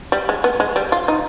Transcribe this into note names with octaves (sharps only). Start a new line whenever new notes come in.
G3
G#3
B3
G#3
G3
F4
D#4